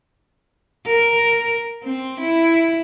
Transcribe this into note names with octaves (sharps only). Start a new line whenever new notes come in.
A#4
C4
E4